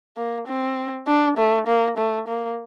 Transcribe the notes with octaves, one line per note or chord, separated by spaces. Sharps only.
A#3
C4
D4
A3
A#3
A3
A#3